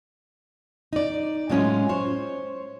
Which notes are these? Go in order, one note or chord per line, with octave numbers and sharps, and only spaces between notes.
D#4 D5
A2 F#3 G#3 C#4 F4
C5 C#5